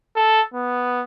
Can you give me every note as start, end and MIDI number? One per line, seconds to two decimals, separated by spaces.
0.16 0.41 69
0.54 1.02 59